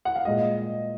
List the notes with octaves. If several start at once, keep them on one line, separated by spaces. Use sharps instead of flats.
F#5
F5
A#2 G#3 D#5